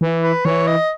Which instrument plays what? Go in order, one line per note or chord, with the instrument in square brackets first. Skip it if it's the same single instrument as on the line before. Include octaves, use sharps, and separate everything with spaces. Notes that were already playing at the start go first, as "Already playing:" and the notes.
[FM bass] E3
[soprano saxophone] B4
[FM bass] E3 [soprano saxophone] C#5
[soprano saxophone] D#5